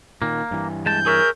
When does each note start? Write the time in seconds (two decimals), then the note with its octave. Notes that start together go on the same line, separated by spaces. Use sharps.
0.22 A#2 D#3 A#3
0.51 G2 E3
0.86 G#3 A5 G6
1.06 G#4 A#4 C#5 E5